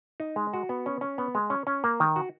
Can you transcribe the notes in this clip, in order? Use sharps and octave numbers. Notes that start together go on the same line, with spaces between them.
D#4
G#3
F#4
B3
C#4
C#4
B3
G#3
C#4
C#4
A#3
D#3
F#4